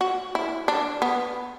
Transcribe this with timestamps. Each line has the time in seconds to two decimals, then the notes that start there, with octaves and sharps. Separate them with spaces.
0.01 F#4
0.35 E4
0.68 D4
1.02 B3